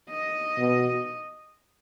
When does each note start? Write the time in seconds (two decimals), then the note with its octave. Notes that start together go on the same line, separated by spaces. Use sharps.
0.10 D#5
0.59 B2